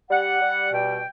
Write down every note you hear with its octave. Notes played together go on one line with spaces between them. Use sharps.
G3 F#5
G3
B2 G5